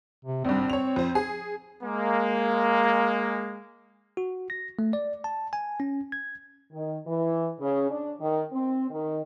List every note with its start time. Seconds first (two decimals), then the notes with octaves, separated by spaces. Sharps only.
0.25 C3
0.45 G#1 G2 C4
0.70 C#5 F7
0.96 F2 C5
1.15 G#4
1.83 G#3 A#3
4.17 F#4
4.50 A#6
4.79 A3
4.93 D5
5.24 A5
5.53 G#5
5.80 C#4
6.12 G#6
6.72 D#3
7.06 E3
7.60 C#3
7.90 D4
8.20 D#3
8.53 C4
8.90 D#3